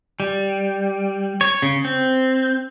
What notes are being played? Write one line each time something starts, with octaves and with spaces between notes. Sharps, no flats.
G3
C#5
C#3
C4